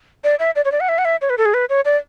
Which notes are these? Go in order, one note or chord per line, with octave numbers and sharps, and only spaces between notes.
D5
E5
D5
C#5
D5
F#5
E5
F#5
E5
C#5
B4
A4
G#4
B4
C#5
D5